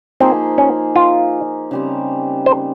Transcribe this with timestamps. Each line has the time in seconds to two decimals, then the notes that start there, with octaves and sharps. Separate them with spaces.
0.20 F3 A#3 C4 D#4 G#4
0.58 C#4
0.96 F4
1.71 C#3 G3 C4
2.46 C5